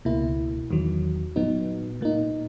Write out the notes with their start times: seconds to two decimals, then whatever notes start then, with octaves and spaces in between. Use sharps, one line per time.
0.05 C#2 B2 A#3 E4
0.71 E2 D#3 F#3
1.36 A#2 F#3 B3 D#4
2.01 A#2 A#3 D#4